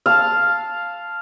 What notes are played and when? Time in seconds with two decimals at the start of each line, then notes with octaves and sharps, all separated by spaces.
0.06 F5 A5